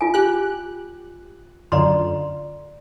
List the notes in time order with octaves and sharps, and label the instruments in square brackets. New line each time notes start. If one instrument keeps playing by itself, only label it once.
[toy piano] F4 G#5
[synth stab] G4 F#6
[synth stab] F#2 D3 F4 [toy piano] D5 A#5 C6